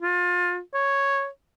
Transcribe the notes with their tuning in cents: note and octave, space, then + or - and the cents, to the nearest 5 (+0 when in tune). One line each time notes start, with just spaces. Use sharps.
F4 +25
C#5 -5